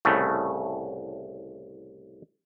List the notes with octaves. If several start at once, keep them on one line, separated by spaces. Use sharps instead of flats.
C2 A2 C#3 A3